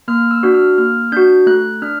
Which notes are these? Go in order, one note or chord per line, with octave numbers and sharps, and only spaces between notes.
A#3 F6
E6
D4 F#4
F6
A#3 F6
D4 F#4 G6
A3 F#6
D4 F6